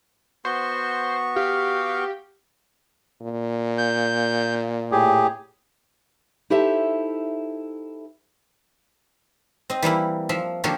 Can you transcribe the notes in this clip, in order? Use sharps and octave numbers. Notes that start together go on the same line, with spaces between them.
B3 F#4 C5 C#6
G4 F5
A#2
G6
A2 G4 G#4
D#4 E4 G4 A4 C5 E5
C4 D#5
E3 G3 A#3 E4
F3 E5
D3 F3 A#3 F#4 G4 A4